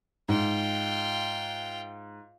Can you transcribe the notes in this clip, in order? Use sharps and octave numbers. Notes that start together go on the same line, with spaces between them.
G#2 F4 G5